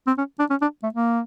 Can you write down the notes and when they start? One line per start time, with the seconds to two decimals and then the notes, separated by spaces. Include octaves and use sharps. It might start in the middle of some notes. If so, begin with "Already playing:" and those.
0.07 C4
0.18 C#4
0.39 D4
0.50 C#4
0.62 D4
0.83 A3
0.94 A#3